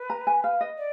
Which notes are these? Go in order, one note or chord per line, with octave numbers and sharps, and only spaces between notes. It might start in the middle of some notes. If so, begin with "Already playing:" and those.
Already playing: B4
A#5
G#5
F5
D#5
D5